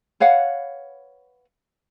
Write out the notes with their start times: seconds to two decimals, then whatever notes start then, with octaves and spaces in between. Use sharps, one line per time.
0.20 B4 C#5 F5 F#5